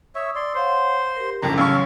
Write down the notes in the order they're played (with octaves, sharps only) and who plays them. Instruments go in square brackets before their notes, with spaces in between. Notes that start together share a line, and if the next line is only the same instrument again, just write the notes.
[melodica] C#5 E5 [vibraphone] C#6 D#6 E6
[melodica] D5 C6
[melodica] C5 C6 [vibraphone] C#5 F5 F#5
[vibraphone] G4 A#4
[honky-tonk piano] F#1 C2 F2 [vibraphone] C#4 D4 [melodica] A#5
[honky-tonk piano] A1 C#3 C#6 [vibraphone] F#3 C#5 [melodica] A4 F5